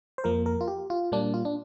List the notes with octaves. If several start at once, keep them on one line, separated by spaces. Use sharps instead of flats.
C5
F2 F3 A#3 A#4
A#4
F4
G4
F4
A#2 G3 A#3 D4
F4
D4